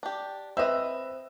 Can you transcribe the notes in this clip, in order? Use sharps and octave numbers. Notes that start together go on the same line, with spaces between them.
D4 G4
C4 B4 D#5 E5 E6